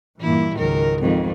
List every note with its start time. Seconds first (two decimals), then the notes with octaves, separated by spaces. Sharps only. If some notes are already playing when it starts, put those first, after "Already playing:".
0.21 G2 A#2 E3 A#3 E4
0.56 G#1 C#2 D#3 F#3 A#4
1.01 F2 G#2 D#3